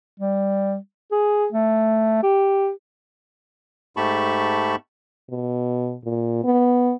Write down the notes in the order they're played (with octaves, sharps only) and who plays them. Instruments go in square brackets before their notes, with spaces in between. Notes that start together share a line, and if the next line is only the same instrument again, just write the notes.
[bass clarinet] G3
G#4
A3
G4
[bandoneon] G#2 A3 G4 A5 B5 C#6
[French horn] B2
A#2
B3